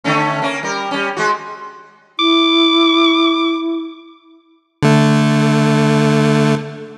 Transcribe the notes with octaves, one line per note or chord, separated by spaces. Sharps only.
D3 A3 C#4
A#3 C#4
G3 A#4
G3 C#4
G#3 F#4
E4 D6
D3 A3